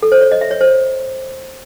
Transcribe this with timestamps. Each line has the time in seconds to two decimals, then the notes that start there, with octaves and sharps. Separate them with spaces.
0.02 A4
0.12 C5
0.21 C#5
0.32 D#5
0.41 E5
0.51 C#5
0.61 C5